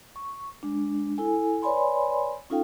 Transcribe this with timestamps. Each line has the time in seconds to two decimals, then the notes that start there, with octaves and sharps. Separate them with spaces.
0.16 C#6
0.63 G#3 D4
1.18 E4 A4 G#5
1.62 B4 C#5 D5 G#5 B5 C6
2.50 C#4 D#4 F4 A4 F5 G5